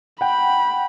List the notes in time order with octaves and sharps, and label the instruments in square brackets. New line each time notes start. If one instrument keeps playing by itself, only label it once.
[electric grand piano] F#5 G5 [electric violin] B5